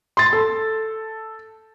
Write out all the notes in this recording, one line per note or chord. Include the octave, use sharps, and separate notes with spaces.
C6 A6
A4